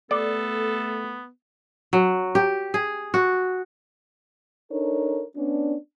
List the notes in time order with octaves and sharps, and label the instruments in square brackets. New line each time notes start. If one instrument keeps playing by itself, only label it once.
[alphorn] A3 [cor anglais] B3 [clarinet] A4 [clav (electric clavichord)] D5
[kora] F#3
G4
G#4
F#4
[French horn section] D4 D#4 A4 A#4 C#5
B3 C#4 D4